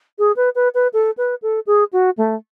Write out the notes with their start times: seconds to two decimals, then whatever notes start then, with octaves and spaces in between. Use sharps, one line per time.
0.19 G#4
0.36 B4
0.55 B4
0.75 B4
0.93 A4
1.17 B4
1.42 A4
1.67 G#4
1.93 F#4
2.18 A3